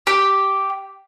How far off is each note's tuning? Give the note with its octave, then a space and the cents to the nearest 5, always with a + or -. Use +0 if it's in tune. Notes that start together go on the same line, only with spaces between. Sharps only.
G4 -5